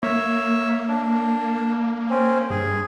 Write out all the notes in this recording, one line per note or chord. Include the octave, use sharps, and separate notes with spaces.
A#3 C#5 E5
D4
C4 C#4
G2 G#4